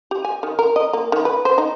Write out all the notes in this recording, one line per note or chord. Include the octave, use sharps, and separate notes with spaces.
G4
G#5
D#3
A#4
D#5
A#3
D#3
B4
C5
D#4